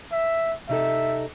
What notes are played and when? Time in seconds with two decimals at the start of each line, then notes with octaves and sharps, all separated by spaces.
0.12 E5
0.69 C3 D#4 A4 E5